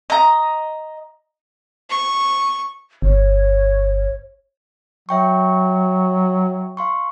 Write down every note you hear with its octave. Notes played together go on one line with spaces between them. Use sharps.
D#5 A#5
C#6
G1 C#5
F#3 E5 G5 C#6
F5 C6 C#6